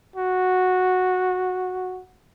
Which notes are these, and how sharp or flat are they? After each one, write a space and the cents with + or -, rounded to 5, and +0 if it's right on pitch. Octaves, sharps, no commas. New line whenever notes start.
F#4 -10